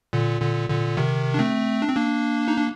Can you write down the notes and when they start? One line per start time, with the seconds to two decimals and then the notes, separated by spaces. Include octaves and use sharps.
0.13 A#2 D3
0.41 A#2 D3
0.69 A#2 D3
0.97 C3 D#3
1.34 D4
1.39 A3 C4
1.82 D4
1.89 C4
1.96 A#3 D4
2.48 D#4
2.57 D4